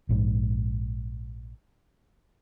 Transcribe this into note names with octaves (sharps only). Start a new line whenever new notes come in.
A#1 G#2